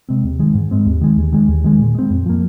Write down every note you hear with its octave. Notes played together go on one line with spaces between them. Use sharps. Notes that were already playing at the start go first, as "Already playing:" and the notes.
C3 G#3 C4
D#2
D#3 G#3
G#2
G#3 C4
D#2
D#3 G#3
D#2
D#3 G#3
D#2
D#3 G#3
A#2
G#3 C4
F2
F3 A#3